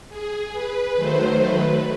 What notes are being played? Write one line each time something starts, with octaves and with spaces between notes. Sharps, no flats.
G#4
B4
D#3 F#3 A3 C5
B4